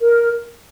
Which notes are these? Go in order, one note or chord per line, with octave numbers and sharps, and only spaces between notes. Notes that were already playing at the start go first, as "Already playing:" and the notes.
A#4